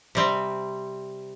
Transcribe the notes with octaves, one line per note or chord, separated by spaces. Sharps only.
C3 G3 C4